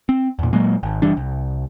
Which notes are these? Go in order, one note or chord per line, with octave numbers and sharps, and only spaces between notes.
C4
E2 A#2
A#2 F#3 G#3 A#3
G#1
F#1 E3 G3 D4
C2